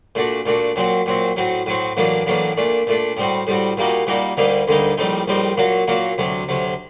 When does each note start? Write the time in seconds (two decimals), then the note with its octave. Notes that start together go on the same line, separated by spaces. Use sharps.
0.15 A#2 A3 D4 F#4
0.46 A#2 A3 D4 F#4
0.76 A#2 F#3 C4 F#4
1.06 A#2 F#3 C4 F#4
1.36 A2 F#3 C4 F#4
1.66 A2 F#3 C4 F#4
1.97 A1 A2 F#3 A#3 D4
2.26 A1 A2 F#3 A#3 D4
2.57 A#2 A3 D4
2.87 A#2 A3 D4
3.17 A2 G3 C4 F#4
3.47 A2 G3 C4 F#4
3.77 A#2 G3 A#3 D#4 F#4
4.07 A#2 G3 A#3 D#4 F#4
4.37 D2 D3 G3 A#3 D#4
4.68 D2 D3 G3 A#3 D#4
4.97 A#1 A2 G3 C4 D#4
5.28 A#1 A2 G3 C4 D#4
5.57 A#2 F#3 A#3 F#4
5.88 A#2 F#3 A#3 F#4
6.18 D2 C3 F#3
6.48 D2 C3 F#3